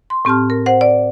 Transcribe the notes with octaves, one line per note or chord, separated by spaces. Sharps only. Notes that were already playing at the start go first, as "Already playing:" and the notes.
C6
A2 C4 G4 A5 F6
A#4
C5 F#5
D5